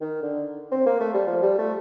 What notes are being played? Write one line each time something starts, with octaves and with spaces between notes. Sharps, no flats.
D#3
D3
C4
A#3
A3
G3
F3
G3
A3